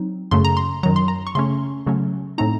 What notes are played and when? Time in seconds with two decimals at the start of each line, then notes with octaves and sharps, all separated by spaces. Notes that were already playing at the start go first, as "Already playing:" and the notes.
Already playing: F#3 C4 D#4
0.31 F#2 C#3 A3 C6
0.45 A#5
0.57 C6
0.83 F#2 D#3 F#3 A#5
0.96 C6
1.08 A#5
1.27 C#6
1.35 C#3 A3 C#4 C6
1.86 C#3 F#3 A3 C#4
2.38 A2 A3 C4 D#4 A#5